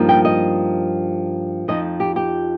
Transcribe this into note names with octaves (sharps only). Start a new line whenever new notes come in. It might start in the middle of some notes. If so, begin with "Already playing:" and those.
Already playing: G2 F3 A#3 D#4
G5
D#5
F2 F3 D#4 D#5
G4
G4